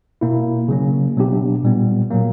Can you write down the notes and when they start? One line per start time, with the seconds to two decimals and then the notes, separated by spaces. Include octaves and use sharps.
0.21 B2 A#3 E4
0.68 C#3 F#3 A#3 C#4
1.16 B2 F#3 B3 D4 G4
1.63 A#2 G3 B3
2.11 A#2 F#3 A#3